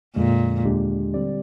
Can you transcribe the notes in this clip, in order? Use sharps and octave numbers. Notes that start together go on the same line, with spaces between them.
F2 A#2 D3 G#3
D#2 D3 G#3 D4 G4
D3 G3 C4 G4 D5